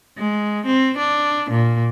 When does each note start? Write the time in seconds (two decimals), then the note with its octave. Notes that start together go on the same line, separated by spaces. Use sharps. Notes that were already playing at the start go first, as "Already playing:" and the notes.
0.17 G#3
0.66 C4
0.98 D4
1.51 A#2